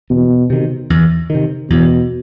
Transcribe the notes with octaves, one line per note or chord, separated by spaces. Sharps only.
E2 B2
C3 D#3
E2
C3 D#3
E2 B2